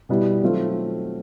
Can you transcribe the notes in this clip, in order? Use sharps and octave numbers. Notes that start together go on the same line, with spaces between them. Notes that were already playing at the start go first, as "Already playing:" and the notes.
B2 G3 B3 E4 G4
D#3 F#3 A3 C4 F4